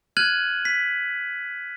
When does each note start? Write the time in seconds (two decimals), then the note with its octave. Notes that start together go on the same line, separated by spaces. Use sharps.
0.17 F6 F#6 G#6 D#7 F#7
0.65 B6